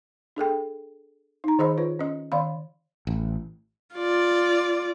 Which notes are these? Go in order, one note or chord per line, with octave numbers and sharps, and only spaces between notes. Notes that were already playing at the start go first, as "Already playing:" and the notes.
D4 G#4 A4 G5
D#4 A#5
D#3 G#4 C5 D#5 B5
F4 B4 C#5
C#4 D#5
D#3 D5 F5 B5
A1
F4 D5